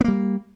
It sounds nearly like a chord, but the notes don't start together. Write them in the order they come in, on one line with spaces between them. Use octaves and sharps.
B3 A#3 G3